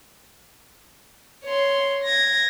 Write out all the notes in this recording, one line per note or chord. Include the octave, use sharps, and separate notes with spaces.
C#5 C6
G#6 A#6